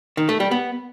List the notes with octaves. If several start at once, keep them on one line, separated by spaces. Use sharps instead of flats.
D#3
A3
G3
B3